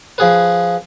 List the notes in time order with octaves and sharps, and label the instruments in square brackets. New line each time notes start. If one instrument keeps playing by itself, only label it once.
[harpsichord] F3 G#4 B4